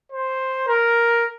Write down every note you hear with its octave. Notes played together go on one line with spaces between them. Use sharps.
C5
A#4